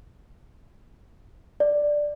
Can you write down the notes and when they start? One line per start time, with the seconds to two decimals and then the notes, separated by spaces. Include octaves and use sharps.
1.60 D5